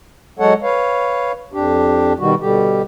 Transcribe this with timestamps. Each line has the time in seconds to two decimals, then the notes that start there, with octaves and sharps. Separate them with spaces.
0.39 F#3 G#3 A4 C#5 F#5
0.63 B4 C#5 F5
1.53 F2 D4 G4
2.19 B2 D#3 G3 F#4
2.40 B2 D3 G3 G4